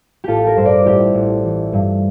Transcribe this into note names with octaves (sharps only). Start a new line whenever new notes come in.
A1 F4 G4 A4
G4 A#4
G2 C5
A#4 D5
A1 E4 G4
A1
E3
G2